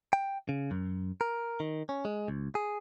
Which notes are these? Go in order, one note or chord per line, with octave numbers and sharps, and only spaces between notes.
G5
C#3
F#2
A#4
D#3
C#4
G#3
C#2
G#4